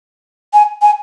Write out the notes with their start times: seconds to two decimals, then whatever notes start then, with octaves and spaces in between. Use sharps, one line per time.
0.53 G#5
0.82 G#5